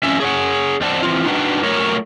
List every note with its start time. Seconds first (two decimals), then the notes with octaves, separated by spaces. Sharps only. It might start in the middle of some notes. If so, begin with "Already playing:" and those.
0.03 F2 C#4 E5
0.20 G#4 C#5 F#5
0.81 F2 C4 C5 D5 F#5 A5
1.03 E3 C4 F4
1.26 D4 D#4 F#4 B4 F#5 G5
1.63 F#3 A3 A#4 C#5